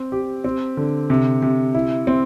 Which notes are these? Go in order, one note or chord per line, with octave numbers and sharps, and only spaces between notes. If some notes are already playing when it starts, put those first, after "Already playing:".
Already playing: C4
G4
C4
D3
C3
C3
E4
C4